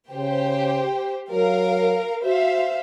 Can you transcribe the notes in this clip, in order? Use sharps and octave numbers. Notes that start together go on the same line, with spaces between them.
C#3 G4 C5 G5
F#3 A#4 F5
F#4 C5 E5 F5